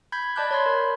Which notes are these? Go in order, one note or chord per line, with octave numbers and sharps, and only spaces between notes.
B5 G6 G#6 B6
D5 D#5 A5 D6 F#6 G6
C#5 B5 C6
A#4